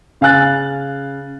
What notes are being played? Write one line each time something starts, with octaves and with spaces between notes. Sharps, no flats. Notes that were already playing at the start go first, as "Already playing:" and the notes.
C#3 F5 G#5 F#6 A6